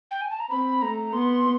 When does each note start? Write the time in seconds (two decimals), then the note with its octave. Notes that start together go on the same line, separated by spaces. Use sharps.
0.11 G5
0.21 G#5
0.30 A5
0.40 A#5
0.50 C4 B5
0.82 A3 A#5
1.13 B3 C6